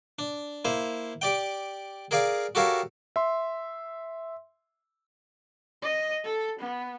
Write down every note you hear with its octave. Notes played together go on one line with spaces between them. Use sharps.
D4
A#3 E4 C5
G4 D5 G5
G#4 A#4 D5 F5 G#5
F#4 G4 A4 A#4 C#5 F5
E5 C6
D#5
A4
B3